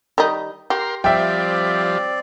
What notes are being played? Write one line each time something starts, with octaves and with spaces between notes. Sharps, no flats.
D#3 G3 D#4
G4 A#4 C6
F3 G3 C4 D5 E5 G5